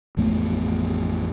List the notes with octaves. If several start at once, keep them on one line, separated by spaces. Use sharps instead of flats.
A1 F2 A3 B3